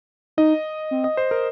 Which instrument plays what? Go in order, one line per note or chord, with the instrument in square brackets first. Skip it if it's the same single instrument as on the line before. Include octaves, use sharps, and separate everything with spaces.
[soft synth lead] D#4 [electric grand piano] D#5
[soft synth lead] C4
[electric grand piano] D#5
C5
A#4